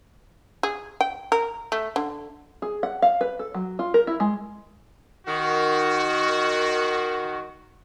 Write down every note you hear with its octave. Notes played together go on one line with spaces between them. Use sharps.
G#4
G5
A#4
A3
D3
G#4
F#5
F5
B4
A4
F#3
F4
A#4
E4
G#3
D#3 F#4